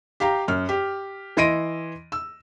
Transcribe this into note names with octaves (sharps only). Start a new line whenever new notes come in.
G4 F5 G5 A#5
F#2 F6
G4
E3 D#5 C6 A#6 D7 D#7
E6